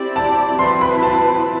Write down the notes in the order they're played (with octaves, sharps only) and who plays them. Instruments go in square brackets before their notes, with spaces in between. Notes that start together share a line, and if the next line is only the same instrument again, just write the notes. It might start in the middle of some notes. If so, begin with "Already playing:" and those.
Already playing: [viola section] C4 E4 G4 D5
[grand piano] A5
[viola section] F3 C4 E4 B4 [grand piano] C6
[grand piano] B5
A5